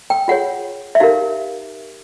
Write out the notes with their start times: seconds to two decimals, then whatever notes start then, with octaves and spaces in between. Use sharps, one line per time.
0.10 G5
0.28 F4 G#4 C#5 F#5
0.95 E5
1.00 D#4 G4 A#4 F5